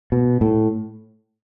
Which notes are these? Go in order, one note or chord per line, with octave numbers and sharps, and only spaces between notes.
B2
A2